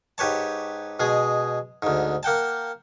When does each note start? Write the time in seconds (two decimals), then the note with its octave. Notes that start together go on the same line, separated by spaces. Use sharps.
0.18 G#2 G4 B4 C#5 A5
1.00 B2 G#3 G#4
1.82 D2 G#2
2.23 A#3 F#5 G5 A5